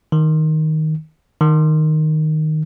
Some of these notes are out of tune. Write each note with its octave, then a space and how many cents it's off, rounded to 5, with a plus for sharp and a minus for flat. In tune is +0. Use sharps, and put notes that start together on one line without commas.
D#3 +5
D#3 -5